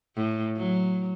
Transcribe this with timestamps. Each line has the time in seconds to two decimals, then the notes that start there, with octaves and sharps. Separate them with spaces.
0.16 A2
0.57 F#3